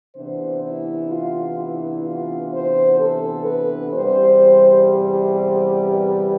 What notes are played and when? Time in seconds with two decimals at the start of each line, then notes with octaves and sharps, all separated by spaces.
0.16 C3 E3 B3 D4 C5
0.63 E4
1.10 F4
1.57 E4
2.04 F4
2.51 C5
2.98 A4
3.45 B4
3.92 E2 C3 G3 C5
4.87 C5
5.81 B4